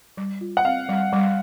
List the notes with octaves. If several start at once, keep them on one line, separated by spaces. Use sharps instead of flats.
G3
F4
F#5
C4 F5
G3
G3